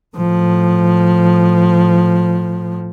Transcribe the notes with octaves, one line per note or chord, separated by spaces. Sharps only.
A2 F3